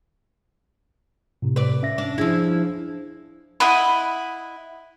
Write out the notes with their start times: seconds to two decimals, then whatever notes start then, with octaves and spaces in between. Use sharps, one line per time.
1.42 A2 C3
1.56 B4 D5
1.82 C#4 E5 A#6
1.98 D4
2.18 F3 D4 E4 G#4
3.60 E4 D#5 F#5 B5